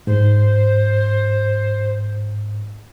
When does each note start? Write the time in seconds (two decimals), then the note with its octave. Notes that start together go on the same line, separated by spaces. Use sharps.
0.07 G#2 C5